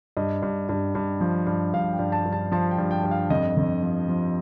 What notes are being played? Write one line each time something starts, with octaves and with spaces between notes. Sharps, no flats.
G2 D#5
G2
G2
G2
F3
G2
G2 F5
G5
G2
A5
G2
A5
F3 A5
G5
G2
G5
G2 G5
F5
F2 D#5
F2
F3
F3